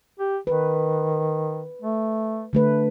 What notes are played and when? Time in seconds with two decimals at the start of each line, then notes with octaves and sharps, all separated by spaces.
0.19 G4
0.47 D#3 B4
1.82 A3
2.53 D3 A3 B4